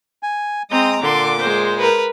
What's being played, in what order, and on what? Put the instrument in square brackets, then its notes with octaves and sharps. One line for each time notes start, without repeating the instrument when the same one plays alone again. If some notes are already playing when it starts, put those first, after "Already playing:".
[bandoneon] G#5
[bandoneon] G#3 [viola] C4 [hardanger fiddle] A#5 D#6
[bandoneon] A#2 [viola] D3 C6 [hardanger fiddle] D6
[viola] G#3 C5
[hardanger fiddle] A#4 B4